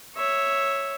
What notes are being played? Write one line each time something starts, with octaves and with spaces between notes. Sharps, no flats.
C#5 E5